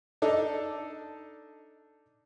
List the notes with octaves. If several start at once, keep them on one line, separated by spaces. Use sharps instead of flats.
D4 D#4 A4